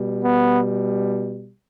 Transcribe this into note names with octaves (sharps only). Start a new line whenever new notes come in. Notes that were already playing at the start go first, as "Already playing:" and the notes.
Already playing: B2 G3
B3